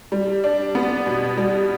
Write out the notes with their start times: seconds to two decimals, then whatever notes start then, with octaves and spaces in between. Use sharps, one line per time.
0.12 G3
0.44 D4
0.75 B3
1.06 B2
1.37 G3